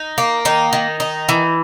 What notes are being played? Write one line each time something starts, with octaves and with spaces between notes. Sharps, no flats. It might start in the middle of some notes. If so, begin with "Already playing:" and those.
Already playing: D#4
A#3
D#3 D#4
D#3
D#4
E3